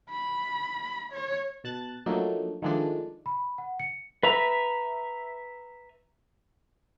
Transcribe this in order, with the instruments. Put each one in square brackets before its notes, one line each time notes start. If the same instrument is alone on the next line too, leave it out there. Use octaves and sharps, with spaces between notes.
[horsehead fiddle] B5
C#5
[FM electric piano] B2 A5 F#6 A6
F3 F#3 A3 A#3 D4 D#4
D#3 F3 G#3 A3 D4
[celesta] B5
F#5
C#7
[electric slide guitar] B4 E5 A#5